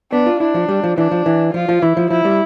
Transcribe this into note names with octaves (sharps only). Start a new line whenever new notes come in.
B3 D4
F4
D4 E4
F3
G3
F3
E3 D4
F3
E3
F3 F4
F3
E3 E4
F3
F3 E4
G3